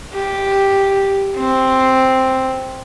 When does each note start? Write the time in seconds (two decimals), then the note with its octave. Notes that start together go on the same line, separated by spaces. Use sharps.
0.14 G4
1.36 C4